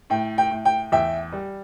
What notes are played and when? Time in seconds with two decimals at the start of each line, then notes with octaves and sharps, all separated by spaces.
0.10 A2 G5
0.38 G5
0.51 A2
0.65 G5
0.92 E2 E5 G5
1.32 G3